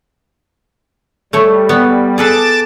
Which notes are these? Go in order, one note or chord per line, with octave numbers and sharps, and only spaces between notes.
G3 A3 C#5
B3 C#5
G#4 A4 B4 A5 D6 A6